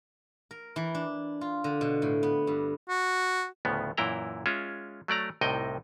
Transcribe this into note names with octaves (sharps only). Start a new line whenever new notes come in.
A#4
E3
D4
F4
D3
B2
A2
B3
G2
F#4
D2 A2 C#3 F3 B3
F#2 A#2 E3 E4 G5 A#5
G#3 C#4 F4 E5
F#3 A3 D5 A#5
C2 A2 C3 D#4 D#5 G5